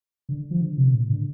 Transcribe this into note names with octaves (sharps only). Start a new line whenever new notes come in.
D3
F3
D3
C3
A2
D3